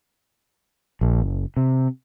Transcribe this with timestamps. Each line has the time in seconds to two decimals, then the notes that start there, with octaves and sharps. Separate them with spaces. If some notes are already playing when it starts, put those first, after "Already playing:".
1.01 A#1
1.22 F#1
1.57 C3